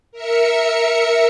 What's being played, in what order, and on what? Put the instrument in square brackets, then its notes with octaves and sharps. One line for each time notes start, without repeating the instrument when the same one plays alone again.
[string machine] A#4 E5 C#7